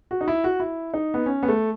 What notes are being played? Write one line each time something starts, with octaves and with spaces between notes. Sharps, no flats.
F#4
D#4
E4
F#4
E4
D#4
B3
C#4
B3
A3